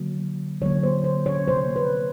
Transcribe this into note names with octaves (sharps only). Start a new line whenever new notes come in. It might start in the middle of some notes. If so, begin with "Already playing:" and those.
Already playing: D3 F#3 A#3
D3 F#3 A#3 C#5
C5
C5
C#5
C3 F3 A#3 C5
B4